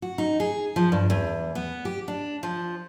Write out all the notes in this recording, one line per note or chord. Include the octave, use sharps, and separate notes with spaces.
F#4
D#4
G#4
F3
G2
E2
B3
G4
D4
F3